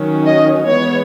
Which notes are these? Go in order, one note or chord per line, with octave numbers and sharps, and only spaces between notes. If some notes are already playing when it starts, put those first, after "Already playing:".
Already playing: D#3 F#3 C#4
D#5
E3 G#3 B3 C#5